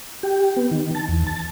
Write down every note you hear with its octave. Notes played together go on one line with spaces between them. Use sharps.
G4
B3
D#3
A5
E2
A5